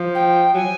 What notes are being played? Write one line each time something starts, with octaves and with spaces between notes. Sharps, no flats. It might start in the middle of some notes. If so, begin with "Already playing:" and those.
Already playing: F3
G5
F#3 G#5